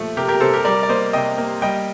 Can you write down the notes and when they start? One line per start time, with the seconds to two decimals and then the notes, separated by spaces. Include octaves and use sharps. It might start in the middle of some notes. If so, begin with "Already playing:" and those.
Already playing: A#2 F3 A3
0.17 C3 G4 A#4
0.28 G4 A#4
0.40 C3 A4 C5
0.54 G4 A#4
0.65 G3 A#4 D5
0.83 D5
0.89 A#3 C5 D#5
1.13 C3 D#5 G5
1.38 A#3
1.62 G3 D#5 G5